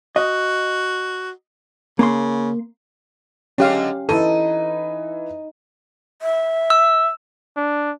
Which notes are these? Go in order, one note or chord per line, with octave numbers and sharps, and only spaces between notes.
F#4 D#5
C#3 A#3 C6
D3 F#3 G#3 C#4 G4 F5
E3 D#4 A4 D#7
E5
E6
D4